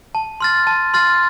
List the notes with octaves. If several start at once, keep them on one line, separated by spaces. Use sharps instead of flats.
A5
C6 F6 A6
A5
C6 F6 A6